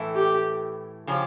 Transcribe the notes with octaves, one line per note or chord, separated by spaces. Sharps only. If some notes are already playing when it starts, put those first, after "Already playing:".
Already playing: A2 E3 A3
G4
C#3 F3 C#4 G4